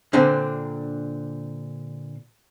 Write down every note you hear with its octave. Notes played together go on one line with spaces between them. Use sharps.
A#2 D3 C4 D4